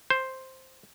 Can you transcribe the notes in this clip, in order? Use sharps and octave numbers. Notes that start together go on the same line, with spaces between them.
C5